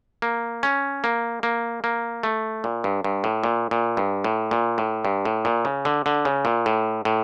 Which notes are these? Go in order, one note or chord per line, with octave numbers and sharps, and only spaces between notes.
A#3
C#4
A#3
A#3
A#3
A3
A#2
G2
G2
A2
A#2
A#2
G2
A2
A#2
A2
G2
A2
A#2
C#3
D3
D3
C#3
A#2
A2
A2